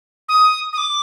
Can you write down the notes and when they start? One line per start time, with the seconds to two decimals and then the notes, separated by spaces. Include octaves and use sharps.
0.29 D#6
0.73 D#6
0.78 D6